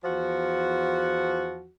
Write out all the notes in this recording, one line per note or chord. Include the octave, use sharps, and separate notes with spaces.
E2 F3 F#4